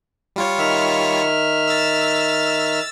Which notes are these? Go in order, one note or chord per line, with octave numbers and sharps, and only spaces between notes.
G3 F4 C#5
D#3 E5 F6
E6 A6